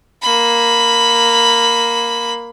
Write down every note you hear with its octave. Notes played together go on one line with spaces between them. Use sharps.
A#3 B5